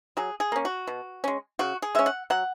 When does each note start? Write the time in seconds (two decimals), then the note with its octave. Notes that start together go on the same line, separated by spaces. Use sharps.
0.17 F#3 G#4
0.40 G#4
0.52 A#3 C#4
0.65 F#4
0.87 B2
1.24 G#3 C#4
1.59 C#3 F#4
1.82 G#4
1.95 G#3 C#4 E5
2.06 F#5
2.30 F#3 F#5